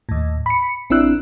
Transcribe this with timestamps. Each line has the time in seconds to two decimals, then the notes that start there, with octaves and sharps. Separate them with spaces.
0.09 D#2 A2
0.46 B5 C#7
0.90 A1 C4 D4 E4 E6 F#6